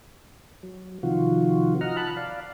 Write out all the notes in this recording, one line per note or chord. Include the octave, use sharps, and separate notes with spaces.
F#3
C3 D#3 F3 F4 F#4
D#5 F#5 A#5 F6
A5 B5 F#6
D5 F5